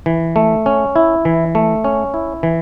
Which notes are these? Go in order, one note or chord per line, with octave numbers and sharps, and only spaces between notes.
E3
A3
C#4
E4
E3
A3
C#4
E4
E3